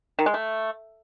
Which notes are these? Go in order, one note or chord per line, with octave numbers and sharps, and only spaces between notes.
D#3
G#3
A3